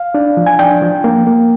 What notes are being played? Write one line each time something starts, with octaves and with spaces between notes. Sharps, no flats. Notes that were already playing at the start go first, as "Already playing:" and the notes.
Already playing: F5
D4
F3
G#5
D4 G5
F3
A#3
A#3